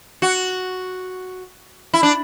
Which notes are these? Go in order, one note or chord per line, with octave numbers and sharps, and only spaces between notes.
F#4
E4
D4